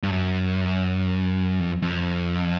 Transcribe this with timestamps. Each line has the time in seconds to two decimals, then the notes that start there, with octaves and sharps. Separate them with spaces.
0.03 G2
0.10 F#2
1.60 F2
1.82 F2